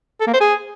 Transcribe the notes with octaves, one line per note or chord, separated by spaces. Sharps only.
A4
A#3
C5
G#4